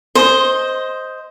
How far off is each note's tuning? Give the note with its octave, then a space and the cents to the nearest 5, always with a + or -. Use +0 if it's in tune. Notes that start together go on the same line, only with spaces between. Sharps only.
C5 +0 D#5 +10 C6 +25